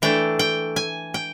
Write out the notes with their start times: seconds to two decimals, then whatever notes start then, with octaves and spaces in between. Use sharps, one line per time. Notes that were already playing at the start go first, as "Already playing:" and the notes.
0.02 E3 A3 D4 G5
0.39 G5
0.76 G#5
1.14 G5